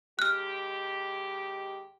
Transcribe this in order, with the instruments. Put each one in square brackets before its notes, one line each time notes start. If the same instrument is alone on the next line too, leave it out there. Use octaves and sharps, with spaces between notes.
[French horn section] D#2 G#3 G4 [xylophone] F6 F#6